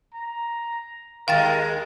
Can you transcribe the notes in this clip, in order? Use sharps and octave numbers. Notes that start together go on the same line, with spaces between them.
A#5
D#2 G#3 A#4 F5 G5 A6